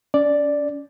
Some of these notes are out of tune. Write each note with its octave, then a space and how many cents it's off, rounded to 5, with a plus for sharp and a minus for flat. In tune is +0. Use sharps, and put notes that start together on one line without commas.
C#4 +35 D5 +0